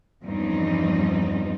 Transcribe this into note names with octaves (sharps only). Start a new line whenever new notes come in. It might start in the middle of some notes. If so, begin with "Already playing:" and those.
E2 G2 F3 C4 C#4 D#4